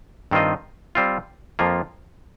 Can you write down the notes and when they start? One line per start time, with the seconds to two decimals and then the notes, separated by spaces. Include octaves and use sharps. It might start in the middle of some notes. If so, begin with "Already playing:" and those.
0.31 G2 D#3 C4 F4 D#5
0.95 G3 C4 F4
1.59 F2 F3 A#3 F4